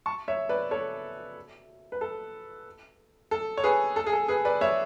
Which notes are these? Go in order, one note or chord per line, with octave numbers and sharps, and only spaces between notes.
A5 C#6
C#5 E5
B4 D5
A4 C#5
B4
A4
A4
C#5
G#4 B4
A4
G#4
A4
G#4 B4
B4 D5
C#5 E5